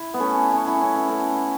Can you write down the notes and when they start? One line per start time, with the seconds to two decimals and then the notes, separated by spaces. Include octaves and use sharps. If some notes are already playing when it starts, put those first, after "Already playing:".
Already playing: E4
0.14 B3
0.20 A3 C#4
0.53 C#4
0.67 E4
0.81 C#4
0.95 E4
1.09 A3 C#4